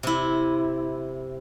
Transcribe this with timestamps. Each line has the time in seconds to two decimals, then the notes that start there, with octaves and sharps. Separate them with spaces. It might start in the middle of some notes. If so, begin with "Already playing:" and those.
0.03 C3 E4